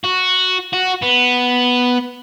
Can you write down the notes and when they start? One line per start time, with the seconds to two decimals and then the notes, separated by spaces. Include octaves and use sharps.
0.04 F#4
0.73 F#4
1.02 B3